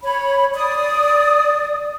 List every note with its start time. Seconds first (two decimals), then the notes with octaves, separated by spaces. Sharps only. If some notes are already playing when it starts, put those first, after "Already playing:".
0.03 C#5 B5
0.54 D5 D#6